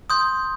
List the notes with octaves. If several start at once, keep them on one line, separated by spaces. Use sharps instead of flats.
C6 D#6 G6